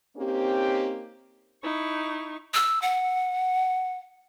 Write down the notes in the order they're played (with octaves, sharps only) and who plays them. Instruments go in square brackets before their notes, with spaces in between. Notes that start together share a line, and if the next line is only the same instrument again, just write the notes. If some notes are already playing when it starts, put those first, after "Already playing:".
[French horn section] A#3 C4 C#4 D#4 G4
[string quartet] D#4 E4 C#6
[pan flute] E6
F#5